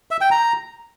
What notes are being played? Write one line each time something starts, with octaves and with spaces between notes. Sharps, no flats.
E5
G5
A#5